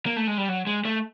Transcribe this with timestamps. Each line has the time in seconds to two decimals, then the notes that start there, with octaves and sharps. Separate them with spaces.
0.06 A#3
0.16 A3
0.27 G#3
0.38 G3
0.49 F#3
0.67 G#3
0.85 A3